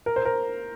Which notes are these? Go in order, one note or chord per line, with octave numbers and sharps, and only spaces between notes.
A#4
C5
A#4